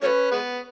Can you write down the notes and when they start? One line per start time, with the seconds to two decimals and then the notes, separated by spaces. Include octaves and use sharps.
0.02 F#3 A3 C#4 B4 C#5
0.32 G#3 B3